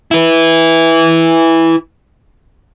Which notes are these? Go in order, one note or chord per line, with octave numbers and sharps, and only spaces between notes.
E4 B4